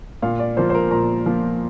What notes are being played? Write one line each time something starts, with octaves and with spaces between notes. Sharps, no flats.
A#2 F5
D5
F3 A#3 F4 C5
C5
A#4
A#2 A#5
F3 A#3 F4